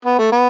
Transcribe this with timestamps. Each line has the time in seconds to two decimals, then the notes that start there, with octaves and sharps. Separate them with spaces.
0.05 B3
0.19 A3
0.32 B3